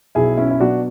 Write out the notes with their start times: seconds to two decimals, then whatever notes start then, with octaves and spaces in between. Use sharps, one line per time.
0.15 B1 E4 G#4
0.37 C#4 E4
0.51 E4
0.60 B2 F#3 D4 F#4